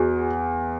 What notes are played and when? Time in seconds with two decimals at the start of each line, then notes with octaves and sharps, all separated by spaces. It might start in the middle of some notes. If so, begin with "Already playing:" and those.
Already playing: E2 F#4 G#4